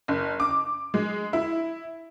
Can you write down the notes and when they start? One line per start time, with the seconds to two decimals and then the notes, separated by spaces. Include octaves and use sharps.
0.08 F#1
0.40 D6
0.94 G#3
1.33 E4